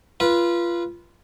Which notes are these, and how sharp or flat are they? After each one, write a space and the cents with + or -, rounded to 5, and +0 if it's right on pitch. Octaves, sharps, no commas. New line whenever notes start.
F4 -20 B4 -25